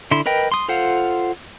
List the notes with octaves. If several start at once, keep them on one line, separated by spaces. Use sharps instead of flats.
D3 E4 C6
A#4 B4 D#5 G5
C6 D#6
F4 A4 C5 F5 F#5